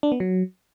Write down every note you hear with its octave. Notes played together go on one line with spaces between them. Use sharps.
D4
B3
F#3